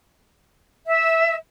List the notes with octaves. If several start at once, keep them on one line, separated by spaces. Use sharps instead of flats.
E5